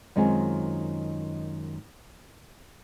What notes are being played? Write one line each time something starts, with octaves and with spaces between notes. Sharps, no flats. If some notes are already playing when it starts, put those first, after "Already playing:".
F#2 D#3 G#3 C4 F4 G#5